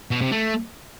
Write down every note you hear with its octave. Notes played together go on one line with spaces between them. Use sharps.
B2
C3
A3